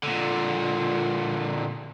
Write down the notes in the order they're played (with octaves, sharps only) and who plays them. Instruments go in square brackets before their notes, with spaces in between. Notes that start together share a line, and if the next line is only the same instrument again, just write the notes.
[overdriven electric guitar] A#2 D3